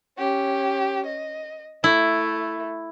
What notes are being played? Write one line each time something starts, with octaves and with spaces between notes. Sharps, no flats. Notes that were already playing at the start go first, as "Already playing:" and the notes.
C#4 G4
D#5
A3 E4